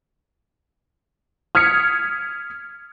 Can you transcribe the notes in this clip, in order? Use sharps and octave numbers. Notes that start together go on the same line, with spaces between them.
D#6 F6 G#6 B6 C#7